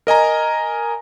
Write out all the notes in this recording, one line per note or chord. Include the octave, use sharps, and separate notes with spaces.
A#4 D#5 G#5 A#5